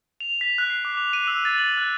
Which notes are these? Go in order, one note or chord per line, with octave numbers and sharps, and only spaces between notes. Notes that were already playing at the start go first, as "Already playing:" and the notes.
F7
B6
F#6
C7
D6
F7
D#7
E6
A6
F#7
F#6